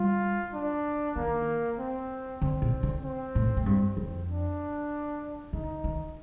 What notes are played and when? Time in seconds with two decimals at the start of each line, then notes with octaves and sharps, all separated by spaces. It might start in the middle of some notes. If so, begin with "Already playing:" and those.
Already playing: G3 F4
0.54 D4
1.16 D#3 A#3
1.79 C4
2.41 D3 C4
2.62 A#2
2.83 D3
3.04 C4
3.35 A2
3.57 A2
3.66 G2 C4
3.97 F2
4.29 D4
5.53 D3 D#4
5.84 D#3